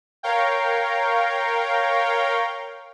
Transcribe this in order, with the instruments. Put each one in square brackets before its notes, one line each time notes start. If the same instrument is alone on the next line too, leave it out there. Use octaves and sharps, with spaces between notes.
[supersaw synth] A#4 C#5 F5 G5